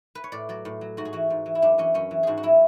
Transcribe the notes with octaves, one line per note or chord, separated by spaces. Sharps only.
B4
C#5
A2 D5
F#3 D5
A2
F#3
G#2 F#4
G#4
E3 F#4
G#2
E3
E4
F#2 D4
E3 C#4
F#2 C#4
E3
G#2 F#4 G#4
F#4
F#3 E4